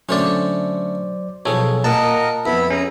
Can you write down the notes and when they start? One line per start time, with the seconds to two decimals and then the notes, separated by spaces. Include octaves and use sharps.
0.09 D3 F#3 A3 C#4 C5 D5
1.46 B1 F3 G#4 A4 C#5
1.84 A#2 A#3 A#4 D#5 F#5 A5
2.46 F2 B3 E4 B5
2.70 C#4 G#4 A#5